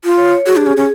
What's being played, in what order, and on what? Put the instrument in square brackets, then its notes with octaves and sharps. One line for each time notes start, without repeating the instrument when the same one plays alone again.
[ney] F4
[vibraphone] C#5
C#5
[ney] F#4 [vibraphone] G#4
[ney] D4 [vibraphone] G4
[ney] C#4 [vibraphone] G#4
[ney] C#4